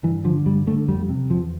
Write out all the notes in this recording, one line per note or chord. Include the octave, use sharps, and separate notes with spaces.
G2 E3
D3 F3
G2 G3
D3 A3
F2 G3
C3
E2 F3